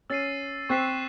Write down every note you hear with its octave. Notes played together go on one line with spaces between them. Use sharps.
C#4 E6 A6 C7 D#7
C4 C#6 F#6 B6 E7